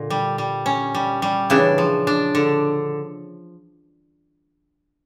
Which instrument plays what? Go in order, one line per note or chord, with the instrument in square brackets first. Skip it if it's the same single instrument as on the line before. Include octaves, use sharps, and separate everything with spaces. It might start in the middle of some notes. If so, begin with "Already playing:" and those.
Already playing: [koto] A#2 [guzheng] D3
[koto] G3
G3
C#4
G3
G3
[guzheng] C#3 E3 [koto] D4
[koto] F3
D4
D3